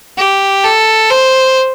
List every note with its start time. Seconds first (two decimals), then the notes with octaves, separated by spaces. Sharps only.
0.18 G4
0.64 A4
1.11 C5